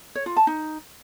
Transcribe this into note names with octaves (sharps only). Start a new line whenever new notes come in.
C#5
F4
A5
D#4